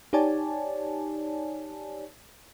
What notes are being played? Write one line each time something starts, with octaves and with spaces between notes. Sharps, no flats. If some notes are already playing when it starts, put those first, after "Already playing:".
D#4 G4 C#5 D5 G#5 A5